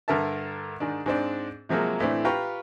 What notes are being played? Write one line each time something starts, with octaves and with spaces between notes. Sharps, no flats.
G2 D3 A#4 E5 A5
G#2 D#3 D4
G#2 C4 D4
C3 F3 F#3 G#3 A#3
A2 E3 A3 C4 D4
F4 G4 B4 G5 A#5 C#6